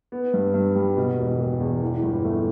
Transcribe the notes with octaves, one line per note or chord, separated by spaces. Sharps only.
B3
G2
G2
G3
B2
E1
E1
E2
E3
G1
A3